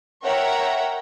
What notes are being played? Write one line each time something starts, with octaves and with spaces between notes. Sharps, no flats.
A#4 C#5 E5 F#5 G5 A#5